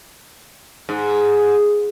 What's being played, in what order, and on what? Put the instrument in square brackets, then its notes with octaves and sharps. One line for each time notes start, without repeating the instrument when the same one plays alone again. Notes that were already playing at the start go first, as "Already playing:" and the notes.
[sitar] G#2